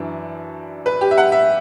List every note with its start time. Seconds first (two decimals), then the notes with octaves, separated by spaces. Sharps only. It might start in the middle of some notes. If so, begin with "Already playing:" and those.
Already playing: F#2 E3 D4
0.86 B4
1.01 G4
1.11 E5
1.17 F#5
1.32 E5